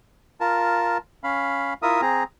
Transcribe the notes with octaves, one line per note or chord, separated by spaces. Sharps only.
F4 A#4 A5
C#4 F5 B5
E4 F4 A#4 E5 D#6
C4 G#4 A#5